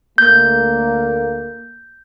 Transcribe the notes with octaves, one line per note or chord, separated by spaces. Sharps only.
D2 A3 A#3 G6